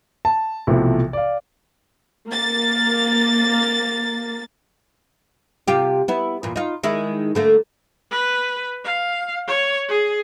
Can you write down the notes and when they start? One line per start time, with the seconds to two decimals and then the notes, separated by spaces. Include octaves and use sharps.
0.25 A5
0.67 B1 C3 E3 F3 A3
1.13 D5 F5
2.29 A#3 A6
5.68 C3 F4 G4
6.08 B3 E4
6.43 E2 A#2
6.56 D#4 F4
6.83 D#3 G#3 E4
7.35 D3 A3 A#3
8.11 B4
8.84 F5
9.47 C#5
9.88 G#4